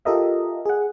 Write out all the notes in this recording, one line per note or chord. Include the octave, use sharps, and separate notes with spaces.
F4 G4 A4 A#4 D#5 E5
G#4 F#5